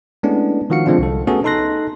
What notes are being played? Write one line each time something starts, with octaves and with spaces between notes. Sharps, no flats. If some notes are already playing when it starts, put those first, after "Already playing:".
G#3 A3 B3 C#4 D4 E4
D#3 F3 F#4 F5 C#7
D3 F3 G#3 C4 D4 F4
C2 A4
A3 B3 C#4 F#4 G#4 A4
D#4 A4 C6 F#6 A#6